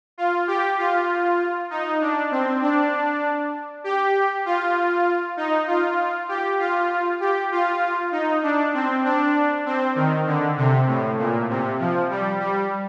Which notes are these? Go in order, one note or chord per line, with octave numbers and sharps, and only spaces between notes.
F4
G4
F4
D#4
D4
C4
D4
G4
F4
D#4
F4
G4
F4
G4
F4
D#4
D4
C4
D4
C4
D#3
D3
C3
A2
A#2
C3
F3
G3
G3